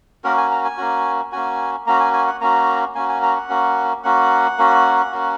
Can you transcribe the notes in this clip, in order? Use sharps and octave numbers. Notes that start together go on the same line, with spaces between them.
A#3 C#4 F#4 A#4
G#5
A#5
G#5
A#3 C#4 F#4
A#3 C#4 F#4 G#5
A#3 C#4 F#4 A#5
G#5
G#5
F#5
A#3 C#4 F#4 A#5
A#3 C#4 F#4 G#5
G#5
A#5
F#5
A#3 C#4 F#4
A#3 C#4 F#4 F#5
A#3 C#4 F#4
A#3 C#4 F#4